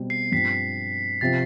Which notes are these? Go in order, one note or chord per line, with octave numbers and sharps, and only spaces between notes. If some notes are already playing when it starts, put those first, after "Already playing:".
Already playing: B2 G3 C4
C7
G2 F3 C4 B6
C3 F3 C4 A6